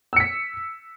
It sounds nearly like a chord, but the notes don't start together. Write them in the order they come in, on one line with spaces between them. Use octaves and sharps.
E6 C#7 B6